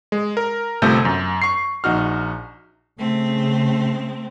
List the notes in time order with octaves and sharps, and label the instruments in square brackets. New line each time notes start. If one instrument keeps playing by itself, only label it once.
[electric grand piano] G#3
A#4
G1 C3 A3 F4 A4 G6
F#2
C#6 C7
A#1 D#4 F#4 F6
[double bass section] C#3 [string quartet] A3 C4